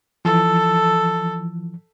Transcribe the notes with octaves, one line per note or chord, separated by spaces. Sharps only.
E3 F3 A4